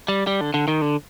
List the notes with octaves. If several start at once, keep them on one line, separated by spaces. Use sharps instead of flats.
G3
G3
D3
D3
D#3
D3